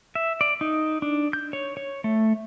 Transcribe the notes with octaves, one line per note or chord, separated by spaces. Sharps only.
E5
D5
D#4
D4
G6
C#5
C#5
A3